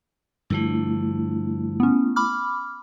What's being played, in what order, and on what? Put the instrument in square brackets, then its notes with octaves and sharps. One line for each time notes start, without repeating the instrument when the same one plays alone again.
[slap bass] G2 D3 F3 [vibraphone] A3 E4
[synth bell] B3 C#4
B5 D6 F6